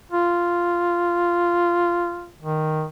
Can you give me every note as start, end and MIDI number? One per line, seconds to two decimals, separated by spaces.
0.11 2.29 65
2.42 2.85 51